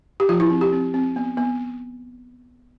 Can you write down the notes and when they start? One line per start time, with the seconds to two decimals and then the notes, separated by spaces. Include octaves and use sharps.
0.20 G4
0.29 F3 F4
0.40 E4
0.50 C4
0.61 G4
0.73 C4
0.94 C4
1.16 B3
1.37 B3